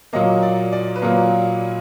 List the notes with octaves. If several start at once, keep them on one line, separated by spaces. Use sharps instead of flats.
A#2 F#3 A#3 D#5
D5
D5
B4
A#2 F#3 A#3 A#4